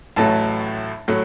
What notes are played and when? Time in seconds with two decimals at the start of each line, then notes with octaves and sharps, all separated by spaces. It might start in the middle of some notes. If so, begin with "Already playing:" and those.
0.16 A1 A2 F#3 A3 A5
1.08 A2 F#3 A3